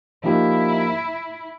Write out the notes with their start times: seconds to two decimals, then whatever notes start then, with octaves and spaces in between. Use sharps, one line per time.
0.23 F3 A#3 D#4 E4 G4